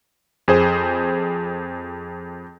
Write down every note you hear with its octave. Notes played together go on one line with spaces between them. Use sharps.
F2 G#4 C5